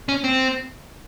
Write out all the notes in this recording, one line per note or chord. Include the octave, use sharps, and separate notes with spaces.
C#4
C4